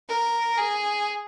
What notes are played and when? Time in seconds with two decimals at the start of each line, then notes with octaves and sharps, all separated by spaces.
0.09 A#4
0.58 G#4